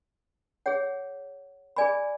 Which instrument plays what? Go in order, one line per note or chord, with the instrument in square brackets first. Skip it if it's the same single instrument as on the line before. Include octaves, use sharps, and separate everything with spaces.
[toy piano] G#4 C#5 F#5
G#4 D5 G#5 B5